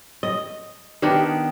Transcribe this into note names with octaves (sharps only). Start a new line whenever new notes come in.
D#5
D#3 B3 D4 G4